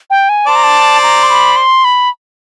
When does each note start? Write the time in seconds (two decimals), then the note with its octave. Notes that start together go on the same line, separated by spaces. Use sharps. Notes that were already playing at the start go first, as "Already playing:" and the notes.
0.10 G5
0.29 G#5
0.47 C5 D5 A5
0.56 A#5
0.64 A5
1.03 A#5
1.23 C6
1.30 B5
1.56 C6
1.85 B5